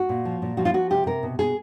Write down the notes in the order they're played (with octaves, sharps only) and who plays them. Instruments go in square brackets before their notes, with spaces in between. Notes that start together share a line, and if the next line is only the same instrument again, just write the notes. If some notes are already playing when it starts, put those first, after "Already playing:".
Already playing: [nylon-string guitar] F#4
A#2
F3
A#2
F3 F#4
F4
F3 F#4
C3 G4
C3 A#4
B2
B2 G#4